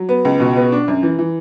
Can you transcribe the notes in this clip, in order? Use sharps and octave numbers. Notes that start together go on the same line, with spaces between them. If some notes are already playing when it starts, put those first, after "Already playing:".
Already playing: F#3
B3
C#2
B2
B3
D4
F#2
E3
E3